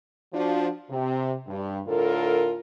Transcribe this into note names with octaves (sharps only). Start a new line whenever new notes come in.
F3 D4 F#4
C3
G2
A2 D3 F4 A4 A#4